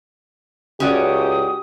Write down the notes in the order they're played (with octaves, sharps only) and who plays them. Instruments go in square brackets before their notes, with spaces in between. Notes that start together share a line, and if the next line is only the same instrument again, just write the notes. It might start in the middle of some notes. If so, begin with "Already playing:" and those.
[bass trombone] C#2 [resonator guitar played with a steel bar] C#4 F#4 D5 [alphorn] G4 [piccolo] D#6